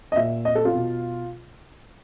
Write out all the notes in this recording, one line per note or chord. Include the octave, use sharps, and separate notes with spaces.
D#5
A#2 E5
D#5
A4
F4
B2